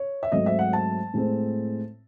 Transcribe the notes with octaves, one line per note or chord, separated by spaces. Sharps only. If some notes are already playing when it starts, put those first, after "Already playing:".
Already playing: C#5
E5
G#2 F#3 A3 C4 D#5
E5
F#5
A5
A2 G#3 C4